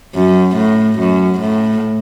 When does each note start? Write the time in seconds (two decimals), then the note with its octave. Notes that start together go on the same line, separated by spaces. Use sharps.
0.14 F#2
0.57 A2
0.99 F#2
1.40 A2